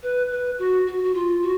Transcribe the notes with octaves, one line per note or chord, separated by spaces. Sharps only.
B4
B4
F#4
F#4
F#4
F4
F#4